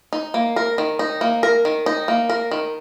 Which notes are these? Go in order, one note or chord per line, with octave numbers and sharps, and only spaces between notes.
D#4
A#3
A#4
D#3
D#4
A#3
A#4
D#3
D#4
A#3
A#4
D#3